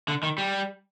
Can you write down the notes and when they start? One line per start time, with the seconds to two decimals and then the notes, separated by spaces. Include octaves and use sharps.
0.08 D3
0.23 D#3
0.38 G3